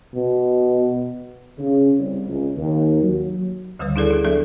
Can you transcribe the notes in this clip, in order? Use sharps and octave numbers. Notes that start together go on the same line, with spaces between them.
B2
C#3
C2
C#2
D#2
F#3
D2 D3 D#3 G3 B4
D4 E4 G#4 A4 D5
D4 G#4
F#3 B3 D4 A4 D5 E5